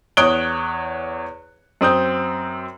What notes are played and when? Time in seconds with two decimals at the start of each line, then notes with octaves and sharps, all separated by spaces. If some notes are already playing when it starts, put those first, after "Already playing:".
0.17 E2 C#5 D#6 F#6 D7 G7
1.81 F#2 C4 D#6 G6